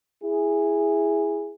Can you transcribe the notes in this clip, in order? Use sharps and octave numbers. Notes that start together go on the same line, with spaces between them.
E4 G#4